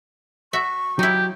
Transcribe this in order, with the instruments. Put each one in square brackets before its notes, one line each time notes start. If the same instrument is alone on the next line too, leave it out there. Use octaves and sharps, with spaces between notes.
[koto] F#4 E5 [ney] C#6
[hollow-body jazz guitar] F#3 [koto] D#4 E4 [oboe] G4